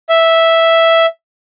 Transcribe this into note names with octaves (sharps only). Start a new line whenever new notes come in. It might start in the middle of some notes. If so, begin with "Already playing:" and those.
E5